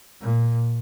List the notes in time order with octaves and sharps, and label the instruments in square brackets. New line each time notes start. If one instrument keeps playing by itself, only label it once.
[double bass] A#2